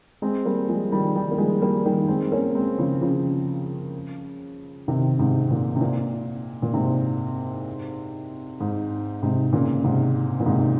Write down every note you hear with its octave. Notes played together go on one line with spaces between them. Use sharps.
G#3 C4
G3 A#3
F3 G#3
D#3 G3
D#3 G3
A#3
F3 G#3
G3 A#3
D#3 G3
G#3 C4
A#3 C#4
G#3 C4
C#3 F3
C#3 F3
C3 D#3
G#2 C3
A#2
C3
A#2
A#2
G#2 C3
G#2
G#2 C3
A#2 C#3
G#2 C3
A#2
G#2 C3